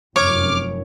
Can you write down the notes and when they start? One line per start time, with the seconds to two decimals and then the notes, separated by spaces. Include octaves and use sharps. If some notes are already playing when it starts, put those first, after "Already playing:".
0.16 F1 F#2 C#5 D6 F6